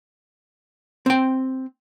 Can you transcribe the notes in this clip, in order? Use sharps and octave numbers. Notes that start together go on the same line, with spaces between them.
C4 G5